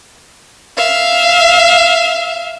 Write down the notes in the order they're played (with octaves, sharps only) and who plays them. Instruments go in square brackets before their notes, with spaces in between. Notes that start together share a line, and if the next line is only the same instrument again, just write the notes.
[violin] E5 F5